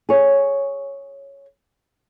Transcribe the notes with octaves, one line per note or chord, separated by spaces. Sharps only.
G#4 C#5